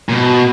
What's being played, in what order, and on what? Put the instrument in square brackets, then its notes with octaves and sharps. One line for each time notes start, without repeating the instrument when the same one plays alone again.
[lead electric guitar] A#2
B2